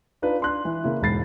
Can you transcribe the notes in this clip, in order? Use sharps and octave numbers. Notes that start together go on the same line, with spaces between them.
D4 D#4 F4 B4
D4 C6 F#6
E3
C#3 A#3 E4
E1 G#2 B5 A6 C7